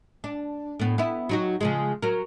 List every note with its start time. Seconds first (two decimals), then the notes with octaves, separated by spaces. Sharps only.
0.24 D4
0.80 A2 B3
0.98 B3 E4
1.29 F#3 D#4 F#4
1.61 C#3 F3 G#3
2.02 F#3 A#4